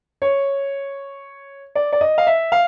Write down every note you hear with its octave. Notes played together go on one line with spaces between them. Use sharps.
C#5
D5
D5
D#5
F5
E5
F5